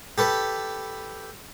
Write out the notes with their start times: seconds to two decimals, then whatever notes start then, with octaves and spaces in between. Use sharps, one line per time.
0.18 G4 A4 B4